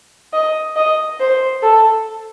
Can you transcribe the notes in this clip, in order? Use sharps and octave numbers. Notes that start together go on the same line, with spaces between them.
D#5
D#5
C5
A4